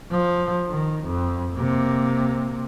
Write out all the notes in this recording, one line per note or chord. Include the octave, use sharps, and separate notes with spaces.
F3
D#3
F2
C3 A#3